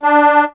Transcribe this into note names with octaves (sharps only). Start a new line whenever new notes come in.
D4